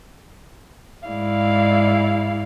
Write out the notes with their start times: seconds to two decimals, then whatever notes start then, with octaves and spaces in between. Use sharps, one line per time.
1.08 G#2 G#3 E4 D5 F5